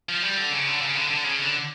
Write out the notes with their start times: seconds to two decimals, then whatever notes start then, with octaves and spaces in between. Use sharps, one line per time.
0.09 F3
0.23 G3
0.37 D3
0.52 C#3
0.67 D3
0.81 C#3
0.95 D3
1.10 D3
1.24 C#3
1.39 D3